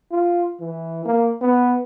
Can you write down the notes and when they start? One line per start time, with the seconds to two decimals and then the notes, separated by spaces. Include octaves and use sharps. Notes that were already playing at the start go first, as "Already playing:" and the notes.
0.11 F4
0.60 E3
1.05 A#3
1.41 B3